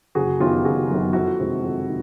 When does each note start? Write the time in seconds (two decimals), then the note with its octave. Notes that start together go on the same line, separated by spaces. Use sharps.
0.15 F#1 F#4 G#4
0.40 F#2 D#3 F#3 B3 F4 G4
0.64 F#1 F#4 G#4
0.90 F#2 D#3 F#3 B3
1.13 F2 E4 F#4
1.39 C3 D#3 G#3 C4
1.62 F2
1.87 D#3